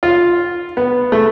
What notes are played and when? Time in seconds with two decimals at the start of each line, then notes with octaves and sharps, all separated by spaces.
0.03 F4
0.77 B3
1.12 A3